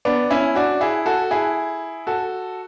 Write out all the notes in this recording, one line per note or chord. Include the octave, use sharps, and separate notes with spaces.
B3 D4
C#4 E4
D4 F#4
E4 G#4
F#4 A4
E4 G#4
F#4 A4